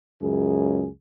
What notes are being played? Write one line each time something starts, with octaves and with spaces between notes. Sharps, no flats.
C#2 F#2 G#4